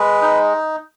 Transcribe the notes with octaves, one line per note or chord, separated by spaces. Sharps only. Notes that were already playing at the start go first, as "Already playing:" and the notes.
Already playing: G#3 B4
D#4